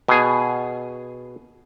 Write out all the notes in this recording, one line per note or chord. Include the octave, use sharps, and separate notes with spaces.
B2 G#4